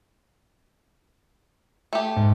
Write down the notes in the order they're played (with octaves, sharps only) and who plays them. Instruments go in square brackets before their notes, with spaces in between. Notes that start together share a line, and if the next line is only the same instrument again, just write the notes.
[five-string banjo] A3 G4
[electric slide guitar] G#2